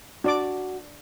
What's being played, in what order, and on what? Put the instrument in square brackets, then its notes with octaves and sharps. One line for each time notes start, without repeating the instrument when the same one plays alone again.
[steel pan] D4 D5 D6 [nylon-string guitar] F#4